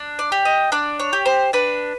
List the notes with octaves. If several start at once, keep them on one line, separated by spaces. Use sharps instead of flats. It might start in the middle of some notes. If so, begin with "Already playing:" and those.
Already playing: D4
D5
G4
D#5
D4 D5
C#5
G4
C5
D4 B4